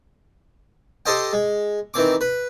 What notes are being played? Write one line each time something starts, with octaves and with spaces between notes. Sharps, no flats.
G4 A4 C5 D#5 G5
G#3
D#3 E3 C4 D6
B4